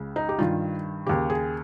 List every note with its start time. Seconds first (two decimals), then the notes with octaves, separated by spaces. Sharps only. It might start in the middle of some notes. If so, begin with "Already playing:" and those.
Already playing: C#2 C#3
0.16 D#4
0.29 G4
0.39 G2 D#3 F4
1.06 D#2 C#3 G4
1.30 G#4